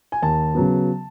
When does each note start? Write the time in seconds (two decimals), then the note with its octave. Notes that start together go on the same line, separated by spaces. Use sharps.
0.12 G#5
0.22 D#2 A5
0.55 C#3 F#3 B3